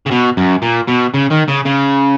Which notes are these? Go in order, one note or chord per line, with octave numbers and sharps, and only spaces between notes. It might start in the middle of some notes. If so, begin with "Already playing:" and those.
C#3
B2
F#2
A#2
B2
C#3
D#3
C#3
C#3